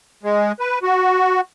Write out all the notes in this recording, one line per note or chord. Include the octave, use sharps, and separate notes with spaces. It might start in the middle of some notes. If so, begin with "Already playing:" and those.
G#3
B4
F#4